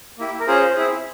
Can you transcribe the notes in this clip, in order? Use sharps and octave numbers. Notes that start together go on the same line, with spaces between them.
A#3 E4 G4
A#4
C#4 F4 G#4 C5
C4 E4 G#4